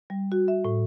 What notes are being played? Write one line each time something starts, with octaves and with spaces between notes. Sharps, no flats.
G3
F#4
E5
A2